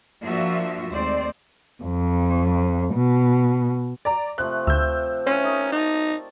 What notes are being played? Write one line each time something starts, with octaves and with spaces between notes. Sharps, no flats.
F3 A#3 D4 F4 F#4 E5
D#2 G#3 A3 C4 C5 D5
F2
B2
D5 A#5
C3 F3 A3 F#6
D2 E6 G6
C#4 E4 G4 C5 C#5
D#4 A#4 D#5
D#4 D5 A5